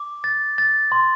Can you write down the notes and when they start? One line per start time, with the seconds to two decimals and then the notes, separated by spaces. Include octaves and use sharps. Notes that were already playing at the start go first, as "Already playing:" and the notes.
Already playing: D6
0.24 A6
0.58 A6
0.92 C6